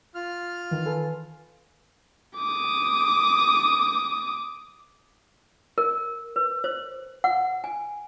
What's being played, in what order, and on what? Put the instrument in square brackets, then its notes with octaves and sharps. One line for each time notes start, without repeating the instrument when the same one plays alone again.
[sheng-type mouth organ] F4 F6
[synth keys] D#3 E3
A4 B4 G#5
[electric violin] D6 D#6
[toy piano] A#4
B4
C5
F#5
G#5